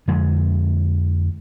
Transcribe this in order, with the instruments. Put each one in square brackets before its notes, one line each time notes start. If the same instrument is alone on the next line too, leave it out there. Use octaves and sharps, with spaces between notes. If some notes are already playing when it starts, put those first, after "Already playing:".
[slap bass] F2 D3 G#3